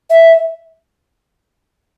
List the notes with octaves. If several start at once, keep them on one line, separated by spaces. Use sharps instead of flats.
E5